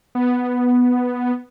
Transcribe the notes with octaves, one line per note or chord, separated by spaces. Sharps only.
B3